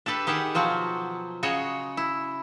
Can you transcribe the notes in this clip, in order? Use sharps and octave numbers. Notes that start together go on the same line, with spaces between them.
D4 G4 A4 B4
D#3 G4 G#4 F#5
B2 F3 F#3 F#4
C#3 F#4 C#5 D#5
E4